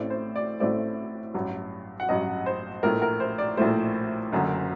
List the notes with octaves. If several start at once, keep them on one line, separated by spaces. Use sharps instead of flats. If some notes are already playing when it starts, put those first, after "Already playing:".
Already playing: A1 A2 A3 C4 D5
C5
D5
A1 A2 A3 C4 D5
A1 G2 F#3
F#5
A1 G2 F#3 D#5
C5
A#1 A2 A3 A#4
A#4
C5
D5
A#1 A2 A3 C5
F#1 F#2 D3 F#3